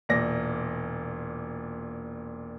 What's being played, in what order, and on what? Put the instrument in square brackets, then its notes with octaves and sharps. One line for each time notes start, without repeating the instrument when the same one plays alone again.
[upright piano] E1 A#2 D5 A#6